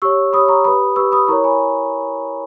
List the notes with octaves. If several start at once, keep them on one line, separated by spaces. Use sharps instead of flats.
G4 C#5 C#6 E6
G4 C#5 B5 D#6
A#5 C#6
G4 B4 B5 D#6
G4 B4 C#6 E6
B5 D#6
E4 A#4 C#5 A#5 C#6
G#5 B5